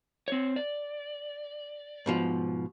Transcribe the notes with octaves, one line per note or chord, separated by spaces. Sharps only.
C4 C#5
D5
G#2 B2 F3